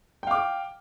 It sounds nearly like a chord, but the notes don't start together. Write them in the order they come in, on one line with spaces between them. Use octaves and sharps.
G5 F5 D6